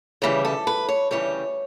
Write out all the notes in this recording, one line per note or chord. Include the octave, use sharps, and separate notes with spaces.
D2 C#3 E3 G3 C#5
A4
B4
C#5
D2 C#3 E3 G3 C#5